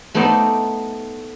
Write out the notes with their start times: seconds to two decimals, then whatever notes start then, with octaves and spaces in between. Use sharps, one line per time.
0.15 A3 B3 D#4 C5 D5